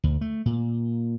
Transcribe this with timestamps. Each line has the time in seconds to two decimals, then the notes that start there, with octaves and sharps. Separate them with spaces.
0.04 D2
0.21 A3
0.46 A#2